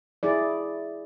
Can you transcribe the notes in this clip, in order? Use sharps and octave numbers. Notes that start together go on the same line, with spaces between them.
E4 G#4 D5